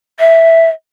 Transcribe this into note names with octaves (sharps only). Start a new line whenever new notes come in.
E5